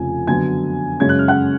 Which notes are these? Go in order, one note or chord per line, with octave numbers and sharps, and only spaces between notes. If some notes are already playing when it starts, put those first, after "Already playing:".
Already playing: F1 F2 C#3 F3 A3 G#5
F#2 D3 F#3 B3 G#5 G#6
F#2 C#3 G#3 C#4 G#6
F#6
F6
F#5 F#6